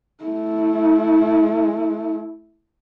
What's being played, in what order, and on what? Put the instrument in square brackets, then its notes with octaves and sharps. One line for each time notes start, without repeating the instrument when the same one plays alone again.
[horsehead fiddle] A3 E4